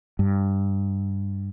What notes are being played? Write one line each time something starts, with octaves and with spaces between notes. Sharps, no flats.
G2